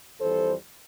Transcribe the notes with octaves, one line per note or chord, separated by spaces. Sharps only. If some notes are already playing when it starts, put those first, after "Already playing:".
F2 E3 G3 A4 C5